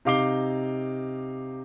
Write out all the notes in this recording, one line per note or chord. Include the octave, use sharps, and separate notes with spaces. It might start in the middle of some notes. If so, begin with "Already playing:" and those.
C3 D#4 F5 D6 C7 G7